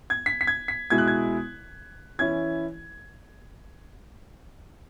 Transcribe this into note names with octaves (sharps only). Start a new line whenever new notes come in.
G#6
B6
B6
G#6
B6
B2 G#3 E4 G#6
F#6
G#6
E3 C#4 E4 G#6